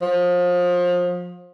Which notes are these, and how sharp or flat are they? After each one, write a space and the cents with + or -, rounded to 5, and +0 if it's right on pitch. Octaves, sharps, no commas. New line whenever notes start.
F3 +30